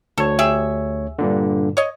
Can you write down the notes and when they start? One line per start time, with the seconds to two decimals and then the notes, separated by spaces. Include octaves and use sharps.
0.18 D2 A4 C#5
0.39 G4 G#4 E5
1.19 G2 A#2 D3
1.77 C#5 D#5